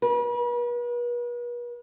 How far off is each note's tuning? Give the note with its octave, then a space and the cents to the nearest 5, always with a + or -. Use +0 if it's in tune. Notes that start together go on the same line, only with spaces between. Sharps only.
B4 -40